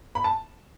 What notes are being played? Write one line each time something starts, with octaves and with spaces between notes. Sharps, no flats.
B5
A5